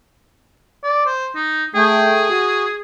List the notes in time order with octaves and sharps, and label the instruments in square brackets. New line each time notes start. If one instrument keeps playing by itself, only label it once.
[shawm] D5
C5
D#4
[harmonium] A3 G5 [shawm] G#4
[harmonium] F#4